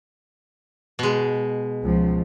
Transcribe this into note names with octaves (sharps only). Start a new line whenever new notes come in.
B2 G#3
C#2 F3